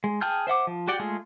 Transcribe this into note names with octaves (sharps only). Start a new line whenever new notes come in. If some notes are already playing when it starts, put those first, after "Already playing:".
G#3
G#4 G5 A5 F6 G6
C5 E5 F#5 D6
F3
F#4 G4 D5 F#5 G5
G#3 A3 F4 G#4